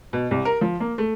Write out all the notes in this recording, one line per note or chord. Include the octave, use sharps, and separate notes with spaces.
B2
C2
A#4
F3
A#3
A3